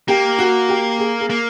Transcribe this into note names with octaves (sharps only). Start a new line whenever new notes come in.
A#3 G4
F#4
G4
G#4
G#4
A#3